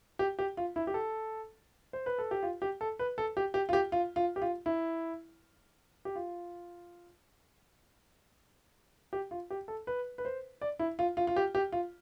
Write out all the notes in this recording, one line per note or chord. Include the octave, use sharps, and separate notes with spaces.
G4
G4
F4
E4
G4
A4
C5
B4
A4
G4
F4
G4
A4
B4
A4
G4
G4
F4
G4
F4
F4
G4
F4
E4
G4
F4
G4
F4
G4
A4
B4
B4
C5
D5
E4
F4
F4
F4
G4
G4
F4